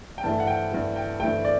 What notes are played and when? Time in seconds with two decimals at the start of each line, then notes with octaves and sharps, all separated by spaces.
0.18 G5
0.23 G2 E3 A3 A5
0.40 F#5
0.47 G5
0.72 G2 E3 A3
0.96 G5
1.20 G2 E3 A3 G5
1.45 D5